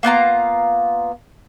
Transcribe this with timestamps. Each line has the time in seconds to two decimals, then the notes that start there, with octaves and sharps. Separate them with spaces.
0.03 A#3 B3 F4 A#5